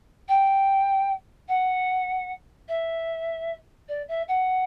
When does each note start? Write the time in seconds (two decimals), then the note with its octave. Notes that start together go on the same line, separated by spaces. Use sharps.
0.28 G5
1.48 F#5
2.68 E5
3.88 D5
4.08 E5
4.28 F#5